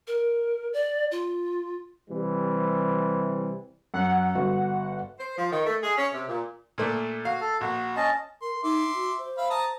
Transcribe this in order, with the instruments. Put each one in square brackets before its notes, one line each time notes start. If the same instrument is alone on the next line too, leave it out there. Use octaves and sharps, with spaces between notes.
[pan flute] A#4
D5
F4
[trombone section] C3 E3 G3
[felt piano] F#2 [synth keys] F#5
[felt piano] G1 F#4
[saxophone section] C5
F3
D#3
A3
G#4
C#4
C3
A#2
[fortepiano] A#2 A3 D4
[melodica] F#4 [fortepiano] F5
[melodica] A4
[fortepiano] A#1 [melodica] F#4
[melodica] C#4 D#5 A5
[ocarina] A#4 [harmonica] C6
[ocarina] D#4 [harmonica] E5 C6 D6
[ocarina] F#4
C5
[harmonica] E5 F5 B5
A5 A#5 D#6